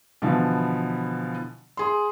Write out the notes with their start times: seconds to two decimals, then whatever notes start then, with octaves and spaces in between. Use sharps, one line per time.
0.22 B2 D3 E3 F3
1.77 G#4 C6